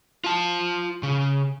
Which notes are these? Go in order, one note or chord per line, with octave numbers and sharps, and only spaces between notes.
F4 A5
C#3